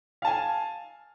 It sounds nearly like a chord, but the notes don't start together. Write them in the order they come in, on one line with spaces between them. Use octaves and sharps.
F5 A5 G#5